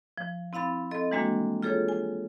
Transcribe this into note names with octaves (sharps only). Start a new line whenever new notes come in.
F3
C4 E4 F5 B5 A6
C4 A4 D#5
E3 G3 G#3 A#3 D4 F#4
F4 G#4 A4 C#5
G#5